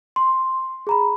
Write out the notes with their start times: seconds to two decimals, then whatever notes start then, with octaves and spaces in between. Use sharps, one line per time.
0.16 C6
0.87 G#4 A#5 B5